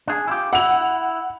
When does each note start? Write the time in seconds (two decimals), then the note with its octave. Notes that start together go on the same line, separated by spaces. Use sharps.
0.08 D4 G#4
0.27 E4 F4 G4
0.53 E4 F#5 F7